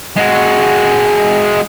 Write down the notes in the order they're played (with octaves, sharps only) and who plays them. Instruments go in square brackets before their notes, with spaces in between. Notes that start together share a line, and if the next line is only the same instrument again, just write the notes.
[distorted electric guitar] G#3 F#4